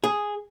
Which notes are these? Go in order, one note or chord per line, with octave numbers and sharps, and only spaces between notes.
G#4